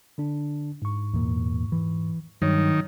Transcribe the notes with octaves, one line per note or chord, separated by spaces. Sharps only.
D3 D4
G#2 C#6
E2 A#2
E3
G2 D#3 F#3 C#5